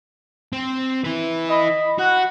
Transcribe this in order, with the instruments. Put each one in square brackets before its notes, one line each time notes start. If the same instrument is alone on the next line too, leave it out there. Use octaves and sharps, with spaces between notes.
[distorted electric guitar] C4
E4 B4
[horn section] D#5 B5
[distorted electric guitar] F#4 [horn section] F#5